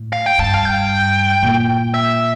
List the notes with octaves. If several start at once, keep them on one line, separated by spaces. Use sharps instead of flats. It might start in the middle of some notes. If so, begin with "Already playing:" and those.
Already playing: A2
F5
G5
G2 A5
F5
G5
A#2
E5